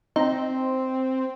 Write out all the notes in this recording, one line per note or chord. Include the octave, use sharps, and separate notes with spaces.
C4 D#4